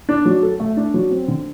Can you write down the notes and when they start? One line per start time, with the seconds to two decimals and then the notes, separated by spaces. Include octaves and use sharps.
0.09 D4
0.25 F#3
0.43 A4
0.60 A3
0.77 D4
0.94 F#3
1.10 C4
1.28 D3